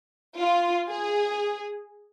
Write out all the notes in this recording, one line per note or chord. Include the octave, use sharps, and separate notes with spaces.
F4
G#4